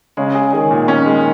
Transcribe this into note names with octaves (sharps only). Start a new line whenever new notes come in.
C#3 G#3
G#4
D#3 G#4
A#2
C#4
G#3